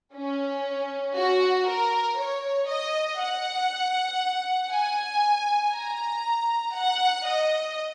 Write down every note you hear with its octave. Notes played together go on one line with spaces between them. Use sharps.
C#4
F#4
A#4
C#5
D#5
F#5
G#5
A#5
F#5
D#5